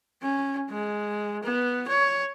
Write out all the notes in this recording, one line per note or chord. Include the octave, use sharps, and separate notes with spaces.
C#4
G#3
B3
C#5